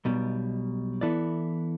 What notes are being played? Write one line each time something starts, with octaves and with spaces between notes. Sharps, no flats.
B1 B2 G3
E3 B3 E4 A4 D5